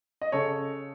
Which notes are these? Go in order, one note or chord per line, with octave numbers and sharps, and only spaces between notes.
D#5
C#3 A4 C#5